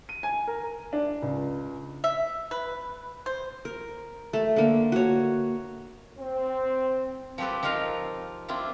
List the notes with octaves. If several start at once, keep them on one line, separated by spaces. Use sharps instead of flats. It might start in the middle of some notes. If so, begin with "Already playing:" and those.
D#7
G#5
A#4
D4
C#2
E5
B4
C5
A#4
A3
D3 A#3
F#4 C#5
C4
F3 C4 G4 A4 B4
F3 D#4 F4 A#4 F5
C4 D4 E4 F4